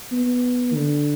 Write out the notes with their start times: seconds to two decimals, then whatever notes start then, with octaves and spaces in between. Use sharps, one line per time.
0.12 B3
0.74 D3